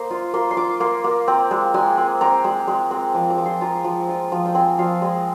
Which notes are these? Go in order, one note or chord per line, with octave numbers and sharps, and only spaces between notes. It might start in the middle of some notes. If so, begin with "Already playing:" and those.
Already playing: A#3 C5 D#5
F4
A#3 C6
C6
F4 D6
A#3 C6
A#3
C4
G#3
G#3 G#5
C4
C4 A#5
G#3
G#3
C4
F3 D6
D6
F3
C6
F4 A#5
F3
F4
F3
G5
C4 G#5
F3 F5
G#3